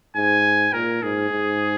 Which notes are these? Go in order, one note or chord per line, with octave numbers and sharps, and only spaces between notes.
G#2 G#5
A#2 A#4
G#2 G#4
G#2